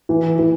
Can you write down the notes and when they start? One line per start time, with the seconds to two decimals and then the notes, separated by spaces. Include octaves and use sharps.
0.09 E3
0.39 E3